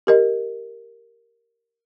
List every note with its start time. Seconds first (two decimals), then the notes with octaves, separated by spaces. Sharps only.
0.07 G4 A#4 D#5